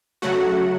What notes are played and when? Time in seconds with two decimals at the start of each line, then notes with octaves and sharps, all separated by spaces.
0.22 C#3 F#3 A3 F#4 F#5